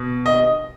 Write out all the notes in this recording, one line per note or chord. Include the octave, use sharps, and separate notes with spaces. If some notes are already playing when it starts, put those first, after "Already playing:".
Already playing: B2
D#5